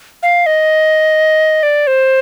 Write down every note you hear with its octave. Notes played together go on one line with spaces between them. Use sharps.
F5
D#5
D5
C5